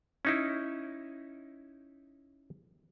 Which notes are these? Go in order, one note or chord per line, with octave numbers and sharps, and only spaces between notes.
C#4 D#4 E4